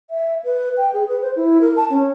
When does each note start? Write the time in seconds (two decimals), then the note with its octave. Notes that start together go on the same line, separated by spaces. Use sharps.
0.10 E5
0.44 B4
0.78 G5
0.93 G#4
1.09 B4
1.22 C5
1.36 E4
1.61 A#4
1.77 A5
1.90 C#4